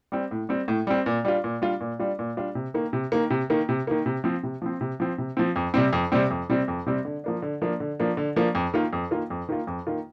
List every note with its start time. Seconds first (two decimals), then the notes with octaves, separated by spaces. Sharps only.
0.12 G3 C4
0.31 A2
0.49 G3 C4
0.68 A2
0.87 G3 C4
1.06 A#2
1.25 G3 D4 F4
1.44 A#2
1.62 G3 D4 F4
1.80 A#2
1.99 G3 D4 F4
2.19 A#2
2.37 G3 D4 F4
2.55 C3
2.74 D#3 A#3
2.93 C3
3.12 D#3 A#3
3.30 C3
3.50 D#3 A#3
3.69 C3
3.87 D#3 A#3
4.06 C3
4.24 F3 C4
4.43 C3
4.62 F3 C4
4.81 C3
5.00 F3 C4
5.18 C3
5.37 F3 C4
5.56 F2
5.74 C3 G3 C4
5.93 F2
6.12 C3 G3 C4
6.30 F2
6.49 C3 G3 C4
6.68 F2
6.86 C3 G3 C4
7.05 D3
7.24 F3 A#3 D4
7.42 D3
7.62 F3 A#3 D4
7.80 D3
8.00 F3 A#3 D4
8.17 D3
8.36 F3 A#3 D4
8.55 F2
8.74 D#3 A#3 F4
8.93 F2
9.11 D#3 A#3 F4
9.30 F2
9.49 D#3 A#3 F4
9.67 F2
9.87 D#3 A#3 F4